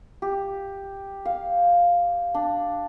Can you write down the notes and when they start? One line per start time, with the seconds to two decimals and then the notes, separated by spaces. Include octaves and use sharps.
0.22 G4
1.25 F5
2.34 D4